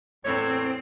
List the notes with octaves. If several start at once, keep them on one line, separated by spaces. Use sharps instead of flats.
E2 A2 C4 C#5